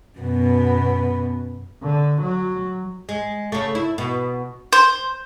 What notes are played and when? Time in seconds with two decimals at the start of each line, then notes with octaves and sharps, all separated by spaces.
0.19 F#2 B2 B3
1.83 D3
2.22 F#3
3.09 G#3
3.52 C#3 A3
3.75 E4
3.98 B2
4.73 C5